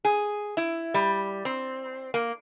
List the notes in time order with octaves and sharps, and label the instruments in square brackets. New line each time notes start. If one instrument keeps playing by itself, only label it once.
[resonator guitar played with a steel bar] G#4
E4
G3
C4
A#3